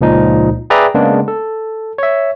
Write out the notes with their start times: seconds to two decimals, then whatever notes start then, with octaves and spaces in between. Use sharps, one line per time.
0.01 C#2 A#2 F3 D#4
0.70 G#4 B4 D5 E5 G5 A#5
0.95 C#3 G#3 A#3 B3 D4
1.28 A4
1.98 C#5 E5